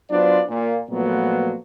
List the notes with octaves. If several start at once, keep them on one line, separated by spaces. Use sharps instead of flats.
F#3 B3 D4 F4 C5 D5
A#2
A#2 F3 F#3 A3 B3